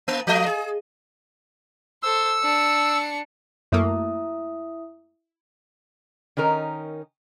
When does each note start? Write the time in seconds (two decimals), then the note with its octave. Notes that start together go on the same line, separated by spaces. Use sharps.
0.08 A#3
0.27 F3 A3 D#5
0.46 G#4
2.03 A4 C5 E6
2.39 D4 C#7
3.72 F#2 A3 A#3 E4 E5 D#6
6.37 D#3 C#4 D#4 A#4